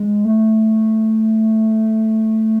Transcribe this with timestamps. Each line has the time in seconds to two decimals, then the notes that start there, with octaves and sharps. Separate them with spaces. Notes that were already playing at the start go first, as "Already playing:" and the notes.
Already playing: G#3
0.25 A3